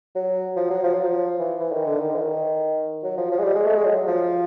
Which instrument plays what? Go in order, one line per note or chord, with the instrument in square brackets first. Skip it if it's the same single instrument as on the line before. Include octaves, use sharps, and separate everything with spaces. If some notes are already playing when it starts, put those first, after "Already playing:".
[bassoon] F#3
F3
F#3
F3
F#3
F3
E3
E3
D#3
D3
D#3
E3
D#3
F#3
F3
F3
G#3
G3
G#3
A3
G#3
F#3
F3